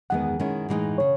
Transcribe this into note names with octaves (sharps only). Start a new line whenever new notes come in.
E2 D#3 G#3 B3 F#5
D#3 G#3 C#4 E4
A2 E3 G#3 B3 D#4
C#3 C#5